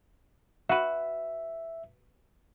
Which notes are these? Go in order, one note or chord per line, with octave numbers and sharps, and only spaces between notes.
F#4 B4 E5